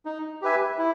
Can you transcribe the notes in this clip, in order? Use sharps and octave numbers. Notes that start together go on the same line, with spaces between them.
D#4
G4 B4 E5 G#5
E4